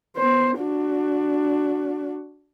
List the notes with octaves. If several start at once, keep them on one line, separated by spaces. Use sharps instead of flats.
B3 C5
D4 F#4